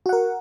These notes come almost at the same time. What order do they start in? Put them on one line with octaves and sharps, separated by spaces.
F#4 F#5 A#4